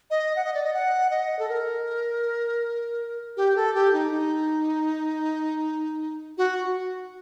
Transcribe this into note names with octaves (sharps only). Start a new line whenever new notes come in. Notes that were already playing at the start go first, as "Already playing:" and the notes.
D#5
F#5
D#5
D5
D#5
F#5
D#5
A4
A#4
G4
A4
G4
D#4
D#4
F#4